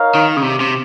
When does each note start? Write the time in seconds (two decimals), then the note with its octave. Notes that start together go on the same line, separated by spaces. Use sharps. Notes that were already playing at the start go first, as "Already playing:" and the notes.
Already playing: D#4 A#4 C#5 F5
0.15 D#3
0.37 C#3
0.42 C3
0.60 C3